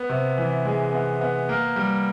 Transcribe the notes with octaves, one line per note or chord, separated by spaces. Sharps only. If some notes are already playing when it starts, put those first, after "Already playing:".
Already playing: B3
C3
E3
G#3
B3
B3
A#3
G3